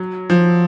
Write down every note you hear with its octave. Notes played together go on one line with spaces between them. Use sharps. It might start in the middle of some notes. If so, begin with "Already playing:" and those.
Already playing: F#3
F3